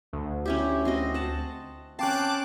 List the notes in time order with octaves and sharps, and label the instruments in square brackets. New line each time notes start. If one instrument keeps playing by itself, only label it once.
[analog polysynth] D2
[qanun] C#4 E4 G4
C4 F#4 D#5
F#5 A5
[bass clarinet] C4 [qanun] C#4 F5 [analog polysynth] A5 D6 F#6